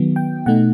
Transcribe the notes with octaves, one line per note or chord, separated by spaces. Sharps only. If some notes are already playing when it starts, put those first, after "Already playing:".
Already playing: D#3 F#3 B3
G5
B2 A3 D#4 F#5